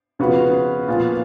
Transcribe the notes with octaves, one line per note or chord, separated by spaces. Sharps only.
C#3 F3 B3 F#4 B4
A#2 F3 B3 F4